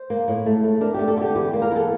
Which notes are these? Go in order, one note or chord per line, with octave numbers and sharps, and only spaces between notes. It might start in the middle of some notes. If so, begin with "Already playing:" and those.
Already playing: C5
A#3
A2
A3
A3
D4 A#4
G4
A3
A4
D3 G4
E2 G4
A#3
A#4
E2
A4